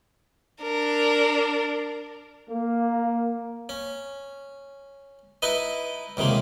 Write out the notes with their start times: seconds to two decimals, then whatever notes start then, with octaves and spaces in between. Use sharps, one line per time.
0.62 D4 A#4
2.49 A#3
3.69 C#4
5.42 D#4 E4 B4 D#5
6.17 C#2 C3 D#3 G#3 A#3